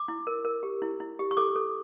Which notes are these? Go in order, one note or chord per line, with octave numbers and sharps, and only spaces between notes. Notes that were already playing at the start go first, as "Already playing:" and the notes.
Already playing: D6
E4
A#4
A#4
G4
E4
E4
G4
C#6
A4 D6
A4